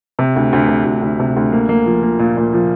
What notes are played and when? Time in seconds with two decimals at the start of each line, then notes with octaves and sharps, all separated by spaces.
0.19 C3
0.36 D2
0.53 D2
0.68 C3
0.85 D2
1.02 D2
1.20 C3
1.36 D2
1.52 A#3
1.69 A#3
1.86 F3
2.03 A#3
2.19 A#2
2.37 A#2
2.53 F3